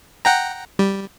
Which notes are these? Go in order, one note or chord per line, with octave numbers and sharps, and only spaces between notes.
F#5 G5 A#5
G3